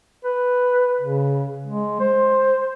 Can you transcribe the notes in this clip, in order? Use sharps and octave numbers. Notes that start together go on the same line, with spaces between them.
B4
C#3
G#3
C5